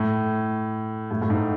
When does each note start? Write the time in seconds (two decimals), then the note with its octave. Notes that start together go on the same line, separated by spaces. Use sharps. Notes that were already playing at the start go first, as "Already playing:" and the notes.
Already playing: A2
1.11 A2
1.22 A2
1.30 G#2